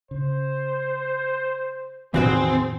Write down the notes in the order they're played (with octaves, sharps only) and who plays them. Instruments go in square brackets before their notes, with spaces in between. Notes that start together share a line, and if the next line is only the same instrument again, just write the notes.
[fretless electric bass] C#3 [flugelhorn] C5
[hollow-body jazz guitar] E2 F#4 C5 [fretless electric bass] A2 C3 D#3 [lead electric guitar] C4 [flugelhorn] G#4